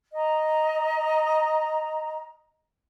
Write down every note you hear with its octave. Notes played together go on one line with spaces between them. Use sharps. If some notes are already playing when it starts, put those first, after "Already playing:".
D#5 A#5